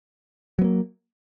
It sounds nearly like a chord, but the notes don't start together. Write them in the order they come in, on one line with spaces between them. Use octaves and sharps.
F#3 B3 A#3